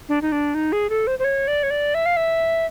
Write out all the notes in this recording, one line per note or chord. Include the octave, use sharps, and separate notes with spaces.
D4
D#4
D4
D#4
G#4
A4
C5
C5
C#5
D5
C#5
D5
E5
F5
E5